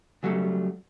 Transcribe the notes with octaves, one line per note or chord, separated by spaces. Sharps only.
C#3 F#3 G3 A3